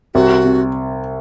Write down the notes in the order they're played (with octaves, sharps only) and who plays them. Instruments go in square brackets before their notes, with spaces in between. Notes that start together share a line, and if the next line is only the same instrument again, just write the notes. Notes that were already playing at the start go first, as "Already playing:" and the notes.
[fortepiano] C2 [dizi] F#4
[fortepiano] C3